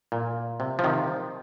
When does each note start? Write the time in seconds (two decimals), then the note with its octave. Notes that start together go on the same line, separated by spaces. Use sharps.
0.12 A#2
0.60 C3
0.79 F3
0.84 C3 D#3